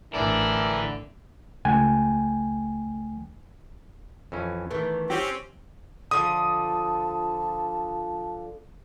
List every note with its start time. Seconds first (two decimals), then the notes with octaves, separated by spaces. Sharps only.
0.14 A1 D3 E3 D4 A#4 D5
1.65 C#2 A3 G5 G#5
4.32 F2 E3 C#4
4.71 D#3 E3 A3 B3
5.10 C4 C#4 G4
6.11 D3 F3 A5 D#6